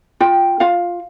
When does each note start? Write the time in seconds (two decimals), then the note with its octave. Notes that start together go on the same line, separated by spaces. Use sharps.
0.20 F4 G5
0.60 F4 F5